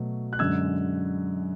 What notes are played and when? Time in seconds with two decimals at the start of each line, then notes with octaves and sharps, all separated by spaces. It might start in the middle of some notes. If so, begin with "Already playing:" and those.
Already playing: B2 F#3 A3
0.33 F#6
0.39 F#2 D3 G#3 E6 G#6